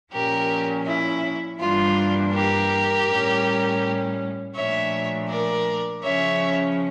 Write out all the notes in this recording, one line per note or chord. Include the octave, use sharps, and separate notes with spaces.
A#2 F3 C#4 G4 A#4
E4
G2 E3 G3 A#3 D4 F4
G4 A#4
A2 G3 C#4
A#2 F3 A3 D4 C#5 E5
A#4 D5
C#3 F3 C#4 C#5 E5